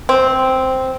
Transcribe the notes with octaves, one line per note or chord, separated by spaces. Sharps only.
C4